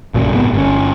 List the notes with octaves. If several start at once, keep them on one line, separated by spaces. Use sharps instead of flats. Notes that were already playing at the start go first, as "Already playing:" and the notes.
A#1 F#2 A#2 C#3
C2 G#2 B3
G1 C#4